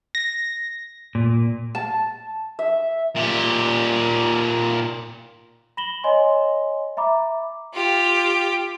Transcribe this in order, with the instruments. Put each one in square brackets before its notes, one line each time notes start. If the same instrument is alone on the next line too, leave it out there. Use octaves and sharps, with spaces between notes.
[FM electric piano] A#6
[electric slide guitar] A#2
[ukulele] A5
[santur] E5
[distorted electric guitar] A#2 G4
[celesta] B5 A#6 E7 F#7 G7
C#5 D#5 G#5 C6
E5 A#5 B5 D6
[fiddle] F4 G4